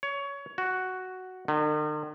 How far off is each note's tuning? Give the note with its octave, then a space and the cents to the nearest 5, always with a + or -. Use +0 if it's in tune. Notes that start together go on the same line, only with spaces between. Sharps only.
C#5 +20
F#4 +5
D#3 -45